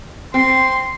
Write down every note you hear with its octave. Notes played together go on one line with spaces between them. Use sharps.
C4 C6